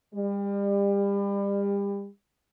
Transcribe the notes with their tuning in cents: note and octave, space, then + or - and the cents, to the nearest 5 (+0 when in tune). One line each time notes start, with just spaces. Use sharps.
G3 +35